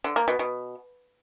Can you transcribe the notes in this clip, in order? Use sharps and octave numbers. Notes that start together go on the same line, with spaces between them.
D3
A#3
B2
B2